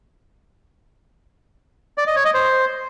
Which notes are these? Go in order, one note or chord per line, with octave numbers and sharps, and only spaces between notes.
D5
D#5
C#5
D#5
C5